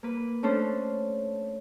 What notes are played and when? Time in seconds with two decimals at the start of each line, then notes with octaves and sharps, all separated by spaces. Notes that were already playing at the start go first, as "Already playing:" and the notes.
0.03 A#3 B4
0.43 A3 C#4 D4 A4 C5